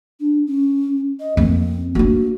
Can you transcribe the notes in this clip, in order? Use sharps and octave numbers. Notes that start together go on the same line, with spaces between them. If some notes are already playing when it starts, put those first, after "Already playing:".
D4
C#4
D#5
F2 A#3 C4
A#3 D4 F#4